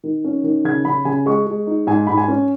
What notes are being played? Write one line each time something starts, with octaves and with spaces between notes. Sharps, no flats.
D#3
C#4
D#3
C#3 G#6
C#3 B5
C#3 G#5
G#3 C#6
G#3
D#4
G#2 G#5
G#2 B5
G#5
C#4